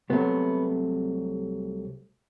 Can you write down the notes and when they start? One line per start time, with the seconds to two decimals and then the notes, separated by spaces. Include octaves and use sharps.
0.10 C2 C3 F#3 A3 B3